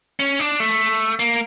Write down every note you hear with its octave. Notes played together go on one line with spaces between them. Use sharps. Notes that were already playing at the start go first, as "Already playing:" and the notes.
C#4
D4
A3
A#3